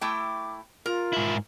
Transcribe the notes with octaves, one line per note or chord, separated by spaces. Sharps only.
A3 E4 G5 D6
F4 A#4
G#2 E4